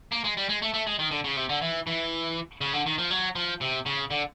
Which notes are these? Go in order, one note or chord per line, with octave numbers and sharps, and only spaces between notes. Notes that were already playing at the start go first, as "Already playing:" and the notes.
A#3
G#3
G3
G#3
A3
A3
G#3
D#3
D3
C#3
C3
D3
E3
E3
C#3
D3
D#3
F3
F#3
F3
C3
C#3
D3